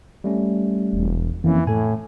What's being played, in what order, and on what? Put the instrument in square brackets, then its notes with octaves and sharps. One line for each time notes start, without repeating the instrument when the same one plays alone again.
[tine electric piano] G3 A3 C#4
[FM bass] E1
[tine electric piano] F2 A#3 C#4 [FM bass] E3
[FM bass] A2 [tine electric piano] A4 G#5